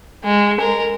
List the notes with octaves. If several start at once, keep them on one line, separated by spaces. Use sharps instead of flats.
G#3
A#4